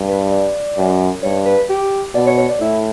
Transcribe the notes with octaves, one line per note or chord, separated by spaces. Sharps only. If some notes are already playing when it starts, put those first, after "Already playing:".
Already playing: G2
B4
D5
F#2
G2 C#5
B4
G4
B2 D5
C#5
C#5
D5
A2 E4